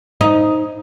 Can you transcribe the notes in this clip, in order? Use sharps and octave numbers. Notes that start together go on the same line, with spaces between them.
D#4